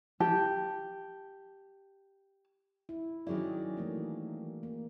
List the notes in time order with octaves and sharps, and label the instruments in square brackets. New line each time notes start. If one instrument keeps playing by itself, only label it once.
[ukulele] G4 A5
[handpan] E4
[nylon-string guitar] D#3 F#3 E4 [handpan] C#4 G#4 D5
[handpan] E3 A3 A#3
A#3